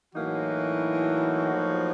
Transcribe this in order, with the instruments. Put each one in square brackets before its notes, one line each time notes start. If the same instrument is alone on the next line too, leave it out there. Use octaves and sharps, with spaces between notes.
[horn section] A2 F#3 A#3 D#4 F#4 [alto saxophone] E3
[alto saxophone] F3